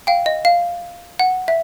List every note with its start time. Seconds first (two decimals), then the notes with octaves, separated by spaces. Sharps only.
0.07 F5 G5
0.26 D#5
0.45 F5
1.19 F#5
1.48 E5